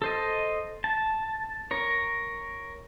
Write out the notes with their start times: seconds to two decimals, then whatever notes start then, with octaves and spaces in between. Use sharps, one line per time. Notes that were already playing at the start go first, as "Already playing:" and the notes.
0.02 A4 C5 D#5
0.84 A5
1.71 A#4 C#5